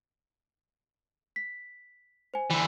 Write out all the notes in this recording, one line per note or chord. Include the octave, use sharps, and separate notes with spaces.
B6
C5 G#5
D3 E3